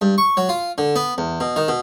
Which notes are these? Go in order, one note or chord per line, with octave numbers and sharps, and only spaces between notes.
G2
C#6
F#3
F4
D3
B3
E2
B2
D#3
B2